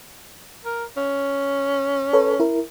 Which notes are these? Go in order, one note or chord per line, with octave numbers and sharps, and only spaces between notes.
A#4
C#4
A4 B4 C#5
E4 A#4